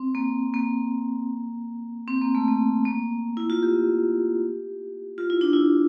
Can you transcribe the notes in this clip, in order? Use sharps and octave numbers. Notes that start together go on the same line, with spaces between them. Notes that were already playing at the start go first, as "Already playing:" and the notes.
Already playing: C4
A#3
A#3
C4
A#3
A3
A#3
A#3
E4
F4
G4
F4
E4
D4
E4